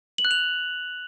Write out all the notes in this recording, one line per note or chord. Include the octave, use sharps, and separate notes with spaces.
F#7
F#6
F7